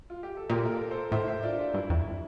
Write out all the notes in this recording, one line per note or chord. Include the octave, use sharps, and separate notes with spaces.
F4
G4
A4
A#2 G4 A#4
A#4
F4 A4
A4 C5
A2 C5 E5
C5 E5
D4 F4
D4 F4
G2 E4
F2